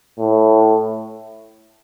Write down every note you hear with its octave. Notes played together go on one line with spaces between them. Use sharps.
A2